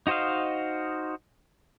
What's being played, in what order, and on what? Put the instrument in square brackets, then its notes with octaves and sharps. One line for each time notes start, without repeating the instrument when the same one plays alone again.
[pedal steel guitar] D#4 F#4 C5 D#5 F5